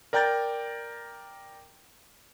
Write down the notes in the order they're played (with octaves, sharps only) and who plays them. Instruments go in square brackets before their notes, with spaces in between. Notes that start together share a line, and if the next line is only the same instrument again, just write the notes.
[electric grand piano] A#4 D5 G5 A#5 G6 A6